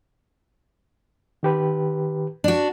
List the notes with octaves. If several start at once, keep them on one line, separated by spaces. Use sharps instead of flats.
D#3 G4 B4
D4 F#4